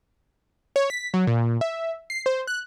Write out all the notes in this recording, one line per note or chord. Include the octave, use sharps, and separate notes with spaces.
C#5
B6
F#3
A#2
E5
C7
C5
F#6